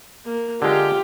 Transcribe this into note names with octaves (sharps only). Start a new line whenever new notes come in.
A#3
D3 G#3 F4 G4